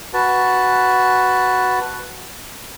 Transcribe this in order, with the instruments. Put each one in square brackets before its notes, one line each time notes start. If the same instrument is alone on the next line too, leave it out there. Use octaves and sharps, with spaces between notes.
[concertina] F#4 B4 A5